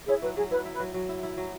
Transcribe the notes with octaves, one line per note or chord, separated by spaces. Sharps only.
E4 G#4 C#5
F#3 B4
F#3 G#4
E4 B4
E4
B4
F#3
F#3
E4
E4
F#3